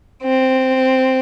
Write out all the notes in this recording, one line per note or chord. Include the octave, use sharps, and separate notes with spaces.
C4